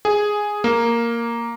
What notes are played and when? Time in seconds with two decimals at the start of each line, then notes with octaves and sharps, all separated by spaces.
0.05 G#4
0.64 A#3